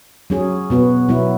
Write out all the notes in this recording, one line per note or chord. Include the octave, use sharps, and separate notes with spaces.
F#3 C#4 G#4
B2 B3 F#4
B2 F#3 B3 E4